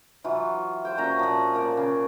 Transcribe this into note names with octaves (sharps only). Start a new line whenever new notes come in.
E3 F#3 F4
C5 G5
A#2 C#4 F#4 A#5
A#2 F3
A#3 D5
C#3